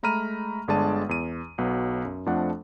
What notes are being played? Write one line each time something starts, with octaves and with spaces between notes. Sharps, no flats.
G#3 A3 A#5 B5 F6 D#7
G1 D3 G#3 D5 A5 D#7
E2 D#7
B1 F#3 B3
F#2
F2 F3 A3 D4 F#5